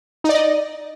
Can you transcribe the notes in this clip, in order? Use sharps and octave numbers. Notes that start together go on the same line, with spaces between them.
D#4 D5 D#5